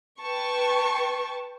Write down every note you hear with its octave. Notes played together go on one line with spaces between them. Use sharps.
B4 G5 A5 C#6